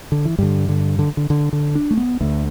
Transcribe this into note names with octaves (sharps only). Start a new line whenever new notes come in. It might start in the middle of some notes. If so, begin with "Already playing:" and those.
D3
E3
G2 D3 G3
D3
D3
D3
D3
D3
D4
A3
B3
D2 D3 A3